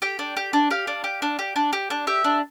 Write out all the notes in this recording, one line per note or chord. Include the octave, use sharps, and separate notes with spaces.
G4 G5
D4
G4
D4
G4 F5
D4
G4
D4
G4
D4
G4
D4
G4 E5
D4